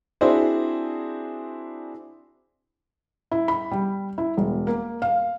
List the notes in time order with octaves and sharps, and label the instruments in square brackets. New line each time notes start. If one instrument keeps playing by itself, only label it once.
[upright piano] C4 D4 E4 F#4 G#4 C5
[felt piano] E4
B5
G3
E4
E1
A#3
F5